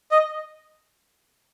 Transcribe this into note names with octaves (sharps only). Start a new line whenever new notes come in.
D#5